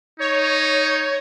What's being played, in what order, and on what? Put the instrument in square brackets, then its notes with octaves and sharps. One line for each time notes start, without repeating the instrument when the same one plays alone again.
[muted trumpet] D#4 [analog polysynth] C#5